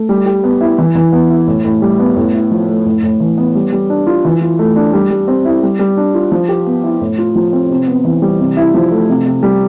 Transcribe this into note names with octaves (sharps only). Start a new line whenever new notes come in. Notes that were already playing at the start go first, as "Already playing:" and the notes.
Already playing: A3
G3
G4
B3
E4
E3
E3
B3
E4
A2
A2
G3
B3
A2
E4
F3
A3
A2
A2
E3
B3
G3
G3
D4
F4
E3
F4
A3
D4
G3
G3
C4
E4
G3
G3
D4
F4
F3
G4
B3
E4
A2
F4
F3
C4
C3
B3
E3
G3
C3
E4
F3
A3
C3
C3
G3